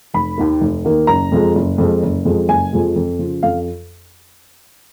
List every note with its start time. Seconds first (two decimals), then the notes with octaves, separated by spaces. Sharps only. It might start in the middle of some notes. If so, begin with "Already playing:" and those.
0.14 F1 B5
0.38 D#2 D#3 A#3
0.61 F1
0.85 D#2 D#3 A#3
1.07 F#1 A#5
1.32 F2 F3 G#3
1.55 F#1
1.78 F2 F3 G#3
2.03 F#1
2.25 F2 F3 G#3
2.48 F#1 G#5
2.73 F2 F3 G#3
2.96 F2
3.19 C#3 F3
3.43 F2 F5